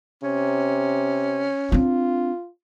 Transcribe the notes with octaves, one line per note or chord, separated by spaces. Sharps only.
C3 C#4
C4 D4 F4